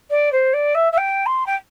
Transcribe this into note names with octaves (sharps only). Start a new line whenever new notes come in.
D5
C5
D5
E5
E5
G5
C6
G5